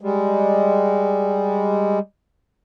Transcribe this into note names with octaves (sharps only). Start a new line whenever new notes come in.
G3 G#3